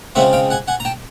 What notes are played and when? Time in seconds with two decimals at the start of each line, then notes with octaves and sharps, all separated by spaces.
0.15 C#3 F3 G#3 C4 E5 F#5
0.33 F5 G5
0.50 F#5 G#5
0.68 F#5 G#5
0.80 A#5
0.85 G5 A5